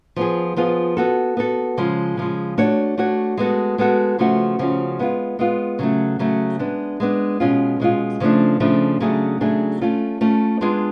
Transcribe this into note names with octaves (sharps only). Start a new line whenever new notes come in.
F3 B3 F4 G#4
F3 B3 F4 G#4
B3 F#4 A4
B3 F#4 A4
C#3 F3 G#3
C#3 F3 G#3
A3 D4 F#4 C#5
A3 D4 F#4 C#5
G#3 B3 F#4 A4
G#3 B3 F#4 A4
C#3 F3 A3 C#4 F#4
C#3 F3 A3 C#4 F#4
G#3 B3 F4
G#3 B3 F4
C#3 F#3 A3
C#3 F#3 A3
G#3 B3 D4
G#3 B3 D4
B2 G#3 C#4 F4
B2 G#3 C#4 F4
C#3 F3 A3 D4
C#3 F3 A3 D4
C#3 F#3 A3 D4 G#4
C#3 F#3 A3 D4 G#4
A3 C#4 F4 A4
A3 C#4 F4 A4
G#3 B3 D4 F4 G#4